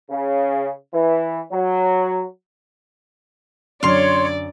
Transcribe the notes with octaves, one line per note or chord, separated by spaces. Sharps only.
C#3
E3
F#3
F#2 D3 C#5 D5 C6 F6